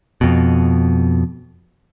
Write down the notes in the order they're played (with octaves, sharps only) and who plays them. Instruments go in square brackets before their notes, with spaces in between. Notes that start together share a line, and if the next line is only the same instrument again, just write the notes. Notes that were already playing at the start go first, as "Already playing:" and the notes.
[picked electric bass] F2 B2